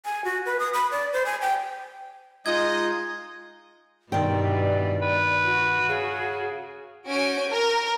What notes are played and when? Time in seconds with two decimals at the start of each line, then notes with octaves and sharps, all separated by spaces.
0.05 G#5
0.25 F#4
0.46 B4
0.60 D#6
0.74 B5
0.92 D5
1.13 C5
1.26 G#5
1.41 G5
2.46 G#3 D#4 F4 D#5 G#6
4.12 G2 B2 D#3 C4 D5 G5
4.43 E3
5.02 B4
5.46 F#4
5.89 C#3 G#4
7.08 C#4 F#4 G#5 G6 D7
7.50 A#4